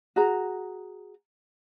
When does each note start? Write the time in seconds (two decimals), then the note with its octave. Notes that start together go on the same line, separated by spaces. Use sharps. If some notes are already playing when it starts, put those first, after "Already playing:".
0.16 F#4 G#4 A#5